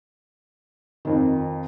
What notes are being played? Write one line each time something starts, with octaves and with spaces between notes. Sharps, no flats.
F2 D#3